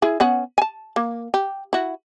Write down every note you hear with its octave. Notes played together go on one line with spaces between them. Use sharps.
E4 G#4
B3 C#4 F#5
G#5 A5
A#3
G4
E4 F#4